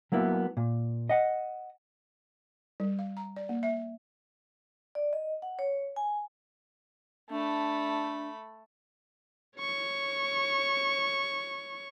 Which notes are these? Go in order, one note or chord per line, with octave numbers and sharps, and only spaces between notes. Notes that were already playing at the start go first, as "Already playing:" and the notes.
F#3 A#3 B3 E4
A#2
D#5 F#5
G3
F5
A#5
D5
A#3
E5
D5
D#5
F#5
C#5
G#5
A3 D4 B5
C#5 C#6